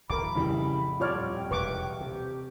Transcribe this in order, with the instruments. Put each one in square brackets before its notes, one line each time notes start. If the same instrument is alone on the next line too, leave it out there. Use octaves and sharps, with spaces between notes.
[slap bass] D1 B1 E3 [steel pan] A#4 D6 [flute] B5
[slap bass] F2 A2 [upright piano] C#3 E3 G3 [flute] B5
[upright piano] D#1 F6 [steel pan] F4 C#5 D5 [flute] D6
[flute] G5
[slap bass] E1 [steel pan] B4 C#6 D6
[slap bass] C3 [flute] G4